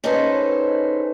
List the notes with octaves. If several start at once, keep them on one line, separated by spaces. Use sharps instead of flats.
C#4 D#4 G#4 A4 B4 C5